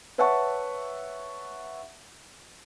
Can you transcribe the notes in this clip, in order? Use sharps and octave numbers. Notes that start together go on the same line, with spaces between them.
B4 C#5 E5 F#5 A5 C#6